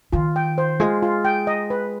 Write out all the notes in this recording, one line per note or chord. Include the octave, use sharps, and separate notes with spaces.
D#3 F4
G5
C5
G#3 F4
F4
G5
D#5
B4